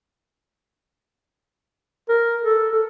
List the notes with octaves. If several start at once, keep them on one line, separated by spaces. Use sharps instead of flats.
A#4
A4
A4